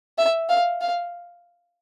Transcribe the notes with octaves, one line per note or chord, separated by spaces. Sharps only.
E5
F5
F5